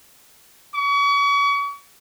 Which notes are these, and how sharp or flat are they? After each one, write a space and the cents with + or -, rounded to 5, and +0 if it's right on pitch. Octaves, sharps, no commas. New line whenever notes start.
C#6 +40